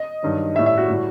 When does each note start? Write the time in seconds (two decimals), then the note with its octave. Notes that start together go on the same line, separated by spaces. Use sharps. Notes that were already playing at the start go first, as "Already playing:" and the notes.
Already playing: D#5
0.22 G2 D#3 F#3
0.55 G3 E5
0.59 A2
0.66 E5
0.78 F#4
0.89 A2 G3